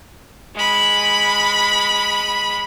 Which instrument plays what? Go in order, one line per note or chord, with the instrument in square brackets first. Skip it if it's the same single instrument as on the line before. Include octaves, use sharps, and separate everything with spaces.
[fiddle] G#3 B5